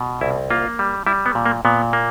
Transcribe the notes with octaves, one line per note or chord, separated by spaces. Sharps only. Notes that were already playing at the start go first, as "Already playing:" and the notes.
Already playing: B2
C2 E4
A#3 F4
G3
G3 E4
B3
A#2
A#3
A#2 B3
A#3